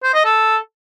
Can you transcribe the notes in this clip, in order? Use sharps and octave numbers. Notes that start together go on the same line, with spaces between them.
C5
D#5
A4